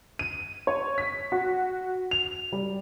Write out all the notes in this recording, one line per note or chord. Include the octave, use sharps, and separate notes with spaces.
D#7
C#5
B6
F#4
F7
G3